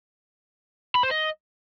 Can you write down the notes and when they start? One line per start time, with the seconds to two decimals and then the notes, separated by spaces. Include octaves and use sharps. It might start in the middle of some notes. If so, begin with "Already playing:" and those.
0.95 B5
1.03 C5
1.11 D#5